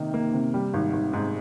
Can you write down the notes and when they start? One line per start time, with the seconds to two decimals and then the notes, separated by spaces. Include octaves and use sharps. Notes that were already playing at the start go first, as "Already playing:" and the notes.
Already playing: C3 D#3 A#3 D#4
0.14 A#3
0.33 C3
0.54 G3
0.74 G#1
0.93 G#1
1.13 G#2